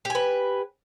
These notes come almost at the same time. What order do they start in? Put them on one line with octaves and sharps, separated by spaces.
G4 G#5 B4